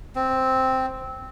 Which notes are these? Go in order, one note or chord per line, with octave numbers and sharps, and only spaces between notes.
C4